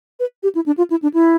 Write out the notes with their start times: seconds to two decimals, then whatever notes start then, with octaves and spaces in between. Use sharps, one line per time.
0.20 B4
0.43 G4
0.55 E4
0.66 D4
0.78 F4
0.90 E4
1.02 D4
1.14 E4